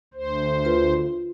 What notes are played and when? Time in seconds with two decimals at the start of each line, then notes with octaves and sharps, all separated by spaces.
0.14 D2 C5
0.65 F4 B4